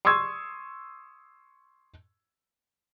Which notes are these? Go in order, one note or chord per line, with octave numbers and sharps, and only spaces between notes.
C6 C#6 D#6 E6 G#6